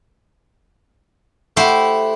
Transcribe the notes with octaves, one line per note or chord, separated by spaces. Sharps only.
A3 E4 G4 C5 F#5